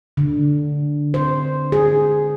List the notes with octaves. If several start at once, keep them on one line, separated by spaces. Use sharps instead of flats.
D3
C5
G#4